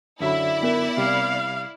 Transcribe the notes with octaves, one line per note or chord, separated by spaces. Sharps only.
F#2 D3 F#3 E4 D5 E5
B3 A#4 E5 E7
C3 G3 F5 D6